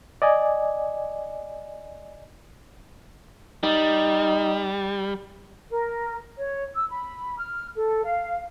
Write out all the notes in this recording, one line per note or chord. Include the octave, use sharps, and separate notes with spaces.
D5 D#5 G#5
G3 D#4
A#4
C#5
E6
B5
F6
A4
F5